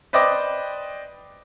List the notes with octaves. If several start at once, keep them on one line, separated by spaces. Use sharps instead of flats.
B4 C5 D5 D#5 G5 D6